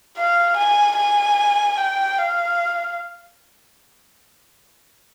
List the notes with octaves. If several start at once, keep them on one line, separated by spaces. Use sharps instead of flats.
F5
G#5
G#5
G5
F5